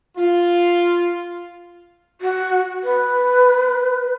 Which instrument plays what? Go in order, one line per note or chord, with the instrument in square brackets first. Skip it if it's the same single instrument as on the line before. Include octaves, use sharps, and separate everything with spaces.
[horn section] F4
[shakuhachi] F#4
B4